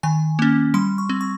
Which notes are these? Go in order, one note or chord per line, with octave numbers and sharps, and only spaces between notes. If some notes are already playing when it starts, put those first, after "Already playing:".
D#3 G#5
A#3 C#4
G3 C6
C#6
C4
C#6